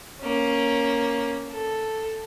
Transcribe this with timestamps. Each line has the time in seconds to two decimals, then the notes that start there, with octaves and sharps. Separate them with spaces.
0.20 A#3 C#4
1.50 A4